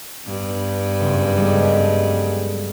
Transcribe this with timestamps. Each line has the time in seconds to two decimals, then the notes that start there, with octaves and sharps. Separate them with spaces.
0.26 G2 B3
1.00 F#1
1.37 G3 G#3 A4